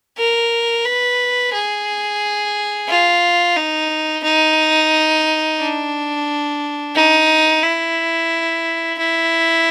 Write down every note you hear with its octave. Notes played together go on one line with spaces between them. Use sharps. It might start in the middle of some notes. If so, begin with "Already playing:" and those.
A#4
B4
G#4
F4
D#4
D#4
D4
D#4
E4
E4